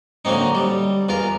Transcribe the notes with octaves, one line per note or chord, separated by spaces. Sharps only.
D3 F#3 A#3 C4 D#4
G3
E2 F4 A#4